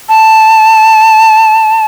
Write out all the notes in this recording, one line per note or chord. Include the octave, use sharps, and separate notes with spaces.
A5